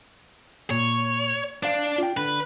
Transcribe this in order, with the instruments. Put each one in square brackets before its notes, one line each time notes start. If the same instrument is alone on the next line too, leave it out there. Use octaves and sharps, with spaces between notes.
[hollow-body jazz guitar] A#2 [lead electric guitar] C#5
[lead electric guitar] D4 [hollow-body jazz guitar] C5 F5
[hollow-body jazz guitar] F4 G5
[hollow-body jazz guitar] D3 [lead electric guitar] B4